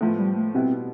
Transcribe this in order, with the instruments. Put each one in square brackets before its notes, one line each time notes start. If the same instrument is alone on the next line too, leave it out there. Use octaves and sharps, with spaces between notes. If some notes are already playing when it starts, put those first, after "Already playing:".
[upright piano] A2 F3 B3 [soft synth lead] A3
[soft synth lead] G3
A3
[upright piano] B2 G3 B3 E4 [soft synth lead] C4